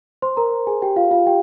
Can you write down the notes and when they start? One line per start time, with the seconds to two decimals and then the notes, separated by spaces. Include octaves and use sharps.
0.22 C5 C6
0.37 A#4 A#5
0.67 G#4 G#5
0.82 G4 G5
0.96 F4 F5
1.11 F4 F5
1.27 G4 G5